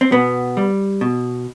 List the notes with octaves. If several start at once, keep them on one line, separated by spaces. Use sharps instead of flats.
C4
B2 B3
G3
B2